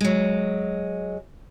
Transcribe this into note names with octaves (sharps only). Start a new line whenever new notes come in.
F#3 G#3